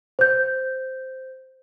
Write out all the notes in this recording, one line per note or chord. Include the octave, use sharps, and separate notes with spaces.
C5 G6